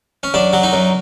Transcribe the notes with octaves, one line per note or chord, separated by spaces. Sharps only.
C#4
F#2 D4
F#3
D#4
F#2